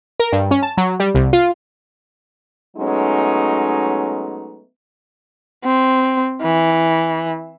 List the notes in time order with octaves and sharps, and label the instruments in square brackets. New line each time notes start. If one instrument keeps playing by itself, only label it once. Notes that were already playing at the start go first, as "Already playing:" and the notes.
[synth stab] A#4
G2
C#4
A5
F#3
G3
C2
F4
[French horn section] F#3 G#3 A3 B3 C#4 D#4
[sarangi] C4
E3